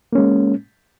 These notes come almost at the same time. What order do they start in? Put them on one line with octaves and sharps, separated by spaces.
A#3 C#4 G#3